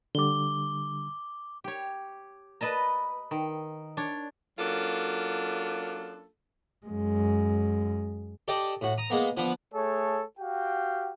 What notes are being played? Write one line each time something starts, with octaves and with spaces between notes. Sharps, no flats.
D3 G3 D6 G7
G4 C#5
B4 D#5 A5 A#5
D#3
D4 C#5
F#3 A#3 C#4 D4 F4 A4
F#2 G#3
G4 A4 D5 D#5 A5
A2 F#4
A#5 D#6
G#3 A#3 B3
D3 F3 B3
A3 G#4 A4 C#5
F#4 G4 F5 G5